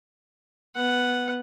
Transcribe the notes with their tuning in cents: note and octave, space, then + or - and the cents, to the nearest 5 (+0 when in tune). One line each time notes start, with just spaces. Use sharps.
B3 +0 F#5 +0